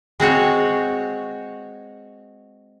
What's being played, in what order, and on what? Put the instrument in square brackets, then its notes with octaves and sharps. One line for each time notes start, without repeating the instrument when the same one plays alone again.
[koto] G#3 C4 F#4 C#5